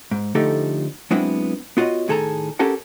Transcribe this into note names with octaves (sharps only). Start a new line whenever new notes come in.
G#2
D3 F3 A3 D#4 G4 A4
F#3 G#3 B3 C4 D4 E4
B3 F4 F#4 C#5 D#5
A2 D#3 G#4 A4 A5 A#5
C#4 G4 A4 A#4 F#5